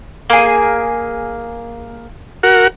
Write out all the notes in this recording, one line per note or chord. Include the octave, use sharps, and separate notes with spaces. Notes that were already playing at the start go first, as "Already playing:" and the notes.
A#3 G#4
F#4 A#4 F#5